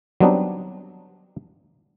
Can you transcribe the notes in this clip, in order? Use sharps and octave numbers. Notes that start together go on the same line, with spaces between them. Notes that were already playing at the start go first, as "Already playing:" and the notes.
F#3 G3 B3 C4 D4 D#4